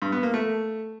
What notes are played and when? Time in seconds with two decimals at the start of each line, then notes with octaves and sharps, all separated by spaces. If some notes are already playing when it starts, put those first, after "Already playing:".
0.02 G2
0.12 B3
0.23 A#3
0.34 A3